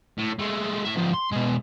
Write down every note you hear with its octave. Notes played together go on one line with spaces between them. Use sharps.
A2
G#3 A3
A2 E5
F3 B3
C6
B2 G#3